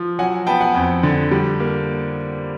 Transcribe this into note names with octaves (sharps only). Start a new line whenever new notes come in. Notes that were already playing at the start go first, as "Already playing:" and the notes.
Already playing: F3
F#3 F#5 G#5
B3 G5 A5
F#5 G#5
F2
D3
G3
A#3